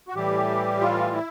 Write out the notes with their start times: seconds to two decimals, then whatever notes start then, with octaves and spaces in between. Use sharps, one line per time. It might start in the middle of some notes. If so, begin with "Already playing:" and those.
0.08 F#4
0.14 A2 E3 G3 G4
0.81 F4
1.13 E4